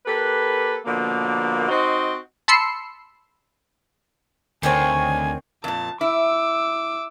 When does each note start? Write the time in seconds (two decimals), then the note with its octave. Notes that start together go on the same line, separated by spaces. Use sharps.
0.06 A#3 G4 A4 B4
0.86 B2 D3 F3 A#3
1.69 C4 D#4 F#4 C5 D#5
2.48 A5 B5 C6 E6 C7 C#7
4.63 D2 D3 D#3 C4 C#5 G#5
5.64 F2 A#2 A5
6.01 E4 D6 E6